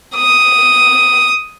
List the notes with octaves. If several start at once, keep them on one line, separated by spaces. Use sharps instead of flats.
D#6